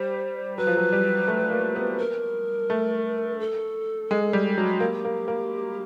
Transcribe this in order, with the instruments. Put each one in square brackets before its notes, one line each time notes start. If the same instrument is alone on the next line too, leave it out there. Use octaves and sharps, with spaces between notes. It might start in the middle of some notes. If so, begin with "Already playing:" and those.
Already playing: [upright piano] G3 [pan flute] C5
[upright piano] F#3 [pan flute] B4
[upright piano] F3
F#3
G3
A3
A#3
B3
[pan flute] A#4
[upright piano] A3
[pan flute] A4
[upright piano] G#3
G3
F#3
[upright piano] A#3 [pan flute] G4
[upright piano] A#3
A#3